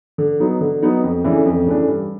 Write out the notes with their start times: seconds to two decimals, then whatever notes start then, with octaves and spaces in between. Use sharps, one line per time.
0.18 D3
0.40 F#3 B3 D#4
0.61 D3
0.82 F#3 B3 D#4
1.04 F2
1.24 C#3 E3 A3 D4
1.45 F2
1.66 C#3 E3 A3 D4
1.88 G2